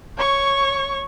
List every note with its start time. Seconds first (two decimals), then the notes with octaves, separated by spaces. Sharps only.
0.18 C#5 C#6